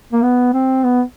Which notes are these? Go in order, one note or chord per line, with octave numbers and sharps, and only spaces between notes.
A#3
B3
C4
B3